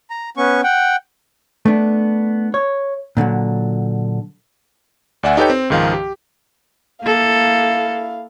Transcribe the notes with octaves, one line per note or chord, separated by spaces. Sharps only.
A#5
B3 C#4 C#6
F#5 G5
A3 B3 D4
C#5
A#2 D3 D#3 F#3
D2 D5 E5 F#5 G#5
D#4 G4 A4 B4 C#5 G5
C4
C#2 G#2 D#3 F3 F5
G4
A#3 E4 A4 F5